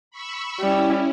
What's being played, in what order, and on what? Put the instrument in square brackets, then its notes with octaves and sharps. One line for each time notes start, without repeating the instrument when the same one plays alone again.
[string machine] B5 C#6 E6
[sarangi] G3 [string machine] C#4 E4